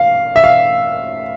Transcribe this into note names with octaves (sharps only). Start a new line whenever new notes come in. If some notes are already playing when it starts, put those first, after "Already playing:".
Already playing: F5
E5
F5